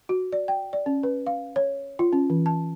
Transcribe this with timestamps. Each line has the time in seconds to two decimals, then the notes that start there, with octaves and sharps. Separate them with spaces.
0.09 F#4
0.32 D5
0.48 G5
0.73 D5
0.86 C#4
1.03 B4
1.27 F5
1.56 C#5
1.99 F4
2.13 C#4
2.30 E3
2.46 A5